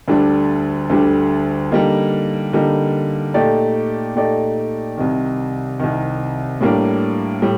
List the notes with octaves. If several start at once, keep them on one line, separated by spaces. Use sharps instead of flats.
D2 D3 G3 D4
D2 D3 G3 D4
D3 G3 A#3 D#4
D3 G3 A#3 D#4
A#2 A3 D#4 G4 D5
A#2 A3 D#4 G4 D5
C2 C3 D#3
C2 C3 D#3
A2 G3 A#3 D4
A2 G3